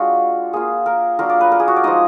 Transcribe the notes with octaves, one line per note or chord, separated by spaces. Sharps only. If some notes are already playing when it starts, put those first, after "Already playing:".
Already playing: G#3 D4 F4 F#4
A#3 F4 G#4
A#4
F#3 D4 F4 A#4
D5
B4
A#4
G#4
F#4
D5
F3 G#3 D#4 D#5